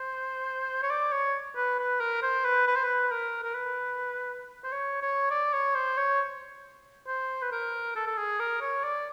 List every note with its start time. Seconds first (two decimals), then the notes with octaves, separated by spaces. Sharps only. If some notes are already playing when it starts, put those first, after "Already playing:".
Already playing: C5
0.82 C#5
0.90 D5
1.12 C#5
1.56 B4
1.79 B4
2.00 A#4
2.22 C5
2.44 B4
2.67 B4
2.75 C5
2.83 B4
3.11 A#4
3.43 A#4
3.54 B4
4.64 C5
4.72 C#5
5.02 C#5
5.31 D5
5.53 C#5
5.75 C5
5.97 C#5
7.07 C5
7.42 B4
7.51 A#4
7.96 A4
8.07 A4
8.17 G#4
8.40 A#4
8.61 C#5
8.83 D5